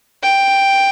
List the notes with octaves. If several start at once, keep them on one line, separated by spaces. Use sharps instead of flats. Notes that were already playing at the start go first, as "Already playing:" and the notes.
G5